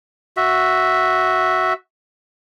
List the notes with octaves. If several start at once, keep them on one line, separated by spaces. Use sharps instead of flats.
F#4 E5